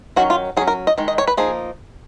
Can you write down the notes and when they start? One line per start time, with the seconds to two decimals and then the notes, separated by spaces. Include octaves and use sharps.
0.16 D#3 F#3 C#4 F#4
0.30 F4
0.57 F#3 G#4
0.61 C#4
0.67 A#4
0.87 D#5
0.98 D#3 G#3
1.08 D#5
1.18 C#5
1.27 B4
1.37 F3 A#3 D#4 G#4